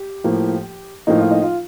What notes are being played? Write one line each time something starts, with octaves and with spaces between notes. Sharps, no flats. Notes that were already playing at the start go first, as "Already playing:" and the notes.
Already playing: G4
A2 F3 A#3
A2 F3 A#3 D#4
F4
D#4
F4